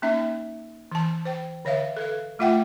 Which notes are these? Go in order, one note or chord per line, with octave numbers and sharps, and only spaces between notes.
A#3 C#4 D#4 E5
E3 A5
C5 G5
D3 C#5 E5 F5
A4 B4 F5
A3 F4 E5 F#5 G5